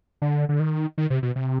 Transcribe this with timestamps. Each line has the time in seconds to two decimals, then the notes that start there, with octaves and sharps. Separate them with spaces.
0.22 D3
0.49 D3
0.60 D#3
0.98 D#3
1.10 C3
1.23 B2
1.36 C3